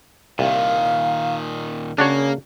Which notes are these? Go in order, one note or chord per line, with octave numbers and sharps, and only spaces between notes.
C2 A#2 D#3 F5
C#3 A#3 D4 F#4 G#4 C#5